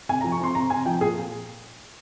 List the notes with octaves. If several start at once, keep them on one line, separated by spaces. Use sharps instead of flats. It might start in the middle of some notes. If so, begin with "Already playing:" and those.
C3 G#5
A#5
F3
C#6
C4 C6
C3 A#5
C3 G#5
F3 G5
A#2 G#4